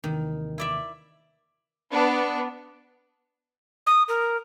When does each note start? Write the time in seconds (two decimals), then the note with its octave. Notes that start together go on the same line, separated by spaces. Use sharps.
0.04 D#2 C3 D#3 E3
0.58 E4 D5 E5
1.91 B3 D4
3.87 D#6
4.08 A#4